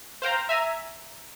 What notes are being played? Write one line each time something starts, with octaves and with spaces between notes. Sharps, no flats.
C5 F5 G5 A#5
E5 G#5 A#5